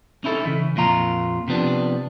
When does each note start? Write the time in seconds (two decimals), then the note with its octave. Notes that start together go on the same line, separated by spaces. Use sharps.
0.24 C#4 D#4 E4 G#4 A4
0.45 C#3 E3
0.76 F2 A#2 F4 A#5
1.48 C3 F3 B3 D4